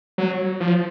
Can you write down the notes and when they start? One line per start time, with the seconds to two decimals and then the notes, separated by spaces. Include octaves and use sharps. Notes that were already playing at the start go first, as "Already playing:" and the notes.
0.18 F#3
0.60 F3